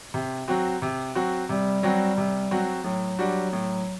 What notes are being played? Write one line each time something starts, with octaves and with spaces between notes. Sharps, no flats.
C3
F#3 C4 F#4
C3
F#3 C4 F#4
C3 G3
F#3 C4 F#4
C3
F#3 C4 F#4
A2 F#3
G3 D4 F#4
A2